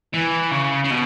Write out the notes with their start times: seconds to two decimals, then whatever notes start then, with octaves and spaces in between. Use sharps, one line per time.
0.14 E3
0.51 C#3
0.84 C#3
0.91 B2